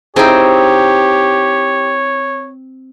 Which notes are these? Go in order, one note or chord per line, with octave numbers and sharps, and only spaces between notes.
C4 D#4 E4 G4 G#4 C5 C#5 G5